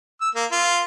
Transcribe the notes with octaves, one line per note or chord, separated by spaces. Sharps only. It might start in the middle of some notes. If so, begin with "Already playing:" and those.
E6
A#3
F4